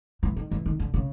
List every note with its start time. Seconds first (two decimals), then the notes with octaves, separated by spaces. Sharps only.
0.23 E3
0.36 D#3
0.51 E3
0.66 D#3
0.80 D3
0.94 C#3